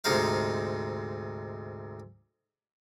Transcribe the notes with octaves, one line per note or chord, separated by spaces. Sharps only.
D2 G#2 C3 D#4 C5 F5